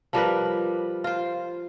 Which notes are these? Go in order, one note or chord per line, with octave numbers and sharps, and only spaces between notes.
F3 G3 A#4 B4
F4 C5